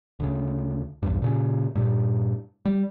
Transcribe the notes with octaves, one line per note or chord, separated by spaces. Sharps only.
D2 C#3
B1 E2 G2
A#2 C#3
G2 A#2
G3